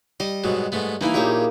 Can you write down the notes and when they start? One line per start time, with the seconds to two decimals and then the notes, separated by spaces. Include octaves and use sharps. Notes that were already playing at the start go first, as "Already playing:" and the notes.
0.20 G3 D#5
0.44 G#2 B2 F#3
0.72 G#2 A3 B3
1.01 E3 A#3 D#4 E4 G#5
1.14 A#1 A#3 G4 G#4 C#5